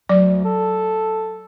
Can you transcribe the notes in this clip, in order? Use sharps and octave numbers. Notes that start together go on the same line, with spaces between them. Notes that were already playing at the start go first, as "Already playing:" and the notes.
D2 F#3 D5
A4